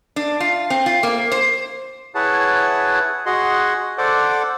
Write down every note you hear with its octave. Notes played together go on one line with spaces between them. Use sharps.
D4
F4
C4
F4
A#3
C5
E4 G#4 B4 C#5 F#5 A5
F#4 G#4 D#5 F#5 C6
A4 C5 D5 F#5 D6